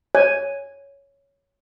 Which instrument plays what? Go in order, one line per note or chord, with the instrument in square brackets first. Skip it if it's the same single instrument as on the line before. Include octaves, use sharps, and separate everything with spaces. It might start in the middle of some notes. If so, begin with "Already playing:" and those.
[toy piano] C#5 [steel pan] G#5